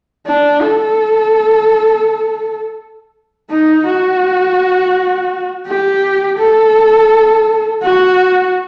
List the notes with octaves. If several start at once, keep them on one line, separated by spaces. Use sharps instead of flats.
D4
A4
D#4
F#4
G4
A4
F#4